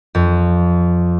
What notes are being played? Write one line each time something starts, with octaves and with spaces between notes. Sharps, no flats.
F2